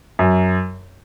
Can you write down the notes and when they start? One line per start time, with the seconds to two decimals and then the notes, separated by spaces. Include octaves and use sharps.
0.19 F#2